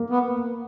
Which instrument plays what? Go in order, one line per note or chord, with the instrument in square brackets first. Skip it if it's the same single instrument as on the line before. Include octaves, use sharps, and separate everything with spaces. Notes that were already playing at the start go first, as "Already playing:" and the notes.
Already playing: [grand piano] A#3
[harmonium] B3